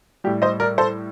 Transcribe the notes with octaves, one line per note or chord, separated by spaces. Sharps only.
A2 G3 G4
C5 D#5
A#4 D5
A4 C5